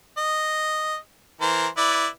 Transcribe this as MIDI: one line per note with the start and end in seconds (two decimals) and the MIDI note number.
0.18 0.97 75
1.41 1.67 52
1.41 1.67 70
1.41 1.67 72
1.77 2.07 64
1.77 2.07 71
1.77 2.07 74